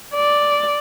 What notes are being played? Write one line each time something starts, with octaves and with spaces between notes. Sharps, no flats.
D5